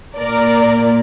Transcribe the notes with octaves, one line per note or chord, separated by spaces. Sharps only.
A#2 A#3 A#4 D5